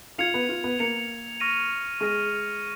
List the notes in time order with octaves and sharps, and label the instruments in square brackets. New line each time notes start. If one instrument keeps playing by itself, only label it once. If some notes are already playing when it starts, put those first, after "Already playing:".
[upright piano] F4 F5 [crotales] G#6 C#7 F7
[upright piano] B3 B4
F4
B3 B4
[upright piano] A#3 A#4 [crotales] G#6 C#7 F7
[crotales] C#6 F6 A#6 D#7
[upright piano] G#3 G#4 [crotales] C#6 F6 A#6 D#7